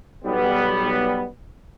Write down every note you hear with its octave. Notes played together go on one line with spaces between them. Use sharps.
B1 G3 B3